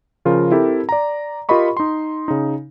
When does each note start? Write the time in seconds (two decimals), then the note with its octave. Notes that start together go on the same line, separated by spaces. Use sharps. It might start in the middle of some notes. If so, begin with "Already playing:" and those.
0.25 C#3 F3 F4 A#4
0.51 C4 E4 G4 A4 A#4
0.89 D5 A#5
1.49 F4 G4 A#4 D#5 B5 C#6
1.77 D#4 C6
2.28 C#3 D#4